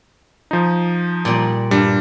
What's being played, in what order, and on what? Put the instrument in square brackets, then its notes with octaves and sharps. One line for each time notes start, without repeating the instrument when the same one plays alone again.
[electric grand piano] F3 D#4
[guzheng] A#2 G3
[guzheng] G2 [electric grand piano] G3